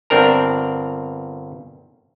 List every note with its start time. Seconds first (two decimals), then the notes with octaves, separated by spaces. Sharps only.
0.10 G1 C4 D4 A#4 A#5